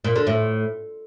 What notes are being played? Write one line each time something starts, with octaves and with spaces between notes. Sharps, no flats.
A#2
D3
A2